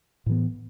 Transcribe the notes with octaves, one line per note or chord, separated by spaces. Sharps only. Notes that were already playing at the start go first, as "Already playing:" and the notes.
A2 E3 B3